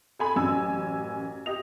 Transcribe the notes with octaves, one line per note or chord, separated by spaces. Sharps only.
A4 G#5 B5
A1 F#2 G#5 E6
G4 D#5 F7